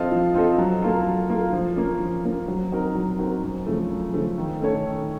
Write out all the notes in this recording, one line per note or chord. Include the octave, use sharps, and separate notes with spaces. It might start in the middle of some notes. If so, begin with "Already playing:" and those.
Already playing: F3 C4 F4 A4 D#5
F3
C4 F4 A4 D#5
F#3
A#3 F4 A4
F#3
A#3 F4 A4
F3
A#3 C#4
F3
A#3 C#4
F#3
C4 D#4 F#4 A#4
F#3
C4 D#4 F#4 A#4
F#2
C#3 F3 A3
F#2
C#3 F3 A3
D#3
A3 C#4 A4 C#5
D#3